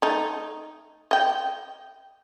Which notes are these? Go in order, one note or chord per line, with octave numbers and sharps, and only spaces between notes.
A3 D#4
D#5 G5